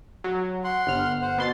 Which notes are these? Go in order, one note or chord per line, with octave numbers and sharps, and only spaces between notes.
F#3
F#5 C6
G1 F6
C5 F#5
B2 C6 A6